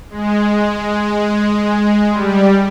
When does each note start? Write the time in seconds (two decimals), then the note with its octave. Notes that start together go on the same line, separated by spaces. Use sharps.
0.10 G#3
2.11 G3